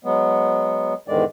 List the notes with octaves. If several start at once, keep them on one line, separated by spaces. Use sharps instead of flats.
F#3 G#3 B3
E2 G#2 D3 D#3 G#3 D5